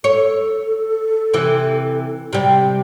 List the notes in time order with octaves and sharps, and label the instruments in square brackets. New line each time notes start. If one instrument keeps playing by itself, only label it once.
[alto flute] A4 [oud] C#5
[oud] C3 E3
C3 G3